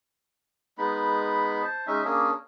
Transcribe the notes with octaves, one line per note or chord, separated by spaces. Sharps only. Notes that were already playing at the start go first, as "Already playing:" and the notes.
G#3 B3 D#4 B5
C5 A5
G#3 C#4 D#4 E5
A#3 C#4 D4 G#4